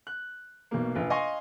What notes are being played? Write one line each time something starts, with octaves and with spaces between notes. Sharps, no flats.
F#6
B1 B2 A#3
F1 A#1 F4 B4
D#5 F5 G#5 C6 C#6